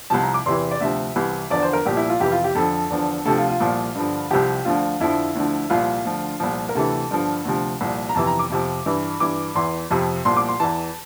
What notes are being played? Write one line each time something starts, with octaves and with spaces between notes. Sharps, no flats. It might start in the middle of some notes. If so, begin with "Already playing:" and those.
C2 C3 F3 A5
A#5
D6
E2 C3 E3 C6
D5
D2 C3 F3 E5
C2 C3 E3
E2 D3 F3 D5
C5
A#4
C2 A#2 F3 G4
E4
F4
F2 C3 E3 G4
F4
G4
F2 D3 F3 A4
E2 D3 F3
D2 C3 F3 A4
F4
F4
C2 A#2 F3
G2 D3 F3
C2 C3 F3 G4
D2 D3 F3 F4
F2 D3 F3 E4
D2 D3 F3
C2 A#2 F3 F4
D2 D3 F3
C2 A#2 F3
A#4
D2 C3 E3 A4
G2 D3 F3
D2 C3 F3
C2 A#2 F3
A#5
F2 C3 E3 A5
A#5
D6
F2 C3 F3
G2 E3
G2 E3 D6
E2 E3 C6
F2 C3 F3
C2 A#2 F3 C6
D6
C6
E2 E3 A5